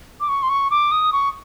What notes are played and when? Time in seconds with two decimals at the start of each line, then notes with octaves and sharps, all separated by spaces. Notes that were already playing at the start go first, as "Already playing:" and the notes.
0.20 D6
0.29 C#6
0.43 C6
0.49 C#6
0.71 D6
0.92 D#6
1.12 C#6